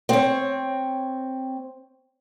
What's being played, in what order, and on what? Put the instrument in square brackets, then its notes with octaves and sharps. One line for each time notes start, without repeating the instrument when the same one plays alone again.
[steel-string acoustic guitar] C4 C#5